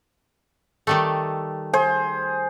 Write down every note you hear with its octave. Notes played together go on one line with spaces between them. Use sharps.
D#3 G3 A3
G#4 C5